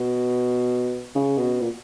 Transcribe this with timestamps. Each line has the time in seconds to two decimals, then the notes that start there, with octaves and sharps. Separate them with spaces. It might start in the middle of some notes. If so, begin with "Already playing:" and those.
Already playing: B2
1.15 C#3
1.38 B2
1.61 A#2